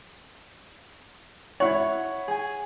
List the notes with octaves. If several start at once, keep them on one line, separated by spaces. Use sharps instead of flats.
E4 C#5 F#5 C#6
G#4 G#5